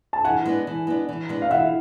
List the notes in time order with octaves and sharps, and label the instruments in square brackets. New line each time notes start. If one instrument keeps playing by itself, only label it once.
[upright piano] A5
[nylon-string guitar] E3 [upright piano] F#5 G#5
[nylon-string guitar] G#3 B3 D4
E3
G#3 B3 D4
E3
G#3 B3 D4
[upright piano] F5
[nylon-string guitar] E3 [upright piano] E5 F#5